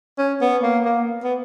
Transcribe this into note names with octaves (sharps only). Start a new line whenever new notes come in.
C#4
B3
A#3
A#3
B3